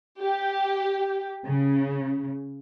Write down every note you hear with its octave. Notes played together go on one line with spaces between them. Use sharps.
G4
C#3